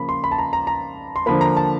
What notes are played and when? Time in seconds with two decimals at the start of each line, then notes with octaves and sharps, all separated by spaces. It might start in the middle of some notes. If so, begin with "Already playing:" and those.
Already playing: C#3 F3 A#3 B5
0.09 C6
0.24 B5
0.31 A5
0.39 A#5
0.53 A#5
0.67 A#5
1.16 C6
1.26 D3 F3 A#3 B5
1.41 A#5
1.57 A5